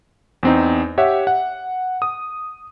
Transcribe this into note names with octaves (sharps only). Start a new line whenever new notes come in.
E2 C4 D#4
G4 C#5 E5 F#5
F#5
D#6